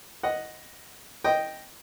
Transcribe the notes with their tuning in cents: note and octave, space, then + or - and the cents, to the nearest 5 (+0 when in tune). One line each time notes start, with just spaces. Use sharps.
D#5 +0 F#5 +0
D#5 +0 G5 -5